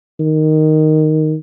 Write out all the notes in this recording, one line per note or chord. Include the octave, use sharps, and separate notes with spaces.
D#3